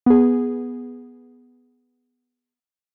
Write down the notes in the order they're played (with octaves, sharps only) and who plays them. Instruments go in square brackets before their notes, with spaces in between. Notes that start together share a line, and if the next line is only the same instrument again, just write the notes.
[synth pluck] B3 G#4